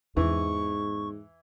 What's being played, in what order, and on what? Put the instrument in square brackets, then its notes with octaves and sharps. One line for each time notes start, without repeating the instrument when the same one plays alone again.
[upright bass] E2 [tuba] G#2 [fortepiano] E3 [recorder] C#6